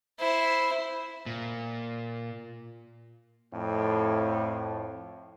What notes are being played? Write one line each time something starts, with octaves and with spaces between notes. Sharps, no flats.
E4 C5
A#2
F2 A2